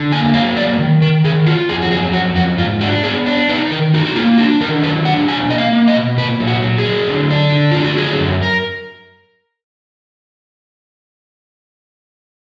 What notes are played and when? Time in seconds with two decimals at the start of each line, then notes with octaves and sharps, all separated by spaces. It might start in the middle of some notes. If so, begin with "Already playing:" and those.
Already playing: D3
0.12 A#3 G#5
0.34 F#3 F5
0.57 A#3 D5
0.79 D#3
1.01 D#3 A#4
1.24 D#3 G#4
1.46 F4 F#4
1.69 F2 G#4
1.82 F#4
1.91 F#3 G#4
2.13 F2 F#4
2.36 F2 F#4
2.58 G#2 F4
2.81 D4 F#4
3.04 B3 G#4
3.26 D4
3.49 D#4 B4
3.71 D#3 A#4
3.94 D#4 F#4
4.05 F#4
4.15 A#3 F4
4.38 D4 F#4
4.60 D#3 A#4
4.83 F#3 B4
5.05 D4 F#5
5.28 B2 G#5
5.50 A#3 D#5
5.58 F5
5.73 A#3
5.88 D#5
5.95 B2
6.18 A#2 B4
6.40 F#3
6.47 F#4
6.63 F#3
6.78 G#4
6.85 F#3
7.08 D3
7.30 D4
7.52 D3
7.72 D3 F4
7.84 F#4
7.97 F#3 G#4
8.20 F#2
8.43 A#4